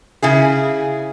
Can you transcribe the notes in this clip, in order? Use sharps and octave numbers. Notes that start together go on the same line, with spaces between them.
C#3 E4 G#4